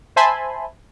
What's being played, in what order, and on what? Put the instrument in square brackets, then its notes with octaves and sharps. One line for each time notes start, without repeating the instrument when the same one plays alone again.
[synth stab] C5 E5 G#5 A5 B5 C6